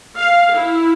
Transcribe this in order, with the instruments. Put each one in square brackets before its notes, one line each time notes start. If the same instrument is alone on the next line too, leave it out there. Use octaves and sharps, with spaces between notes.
[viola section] F5
E4